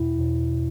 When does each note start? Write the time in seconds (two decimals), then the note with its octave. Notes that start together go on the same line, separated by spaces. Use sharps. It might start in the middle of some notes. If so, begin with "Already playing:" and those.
Already playing: E2 B2 E4
0.17 E2 B2
0.51 B2